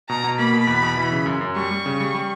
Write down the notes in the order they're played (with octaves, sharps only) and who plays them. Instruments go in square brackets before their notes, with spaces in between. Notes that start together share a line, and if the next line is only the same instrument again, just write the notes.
[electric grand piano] B2 [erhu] A#5
[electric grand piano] B2
[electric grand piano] A#3 [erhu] B5
[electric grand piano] B2
E2
B2
E3
C#3
F#2
F#2
[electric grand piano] G3 [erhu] C#6
[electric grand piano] G3
C#3
G3
G3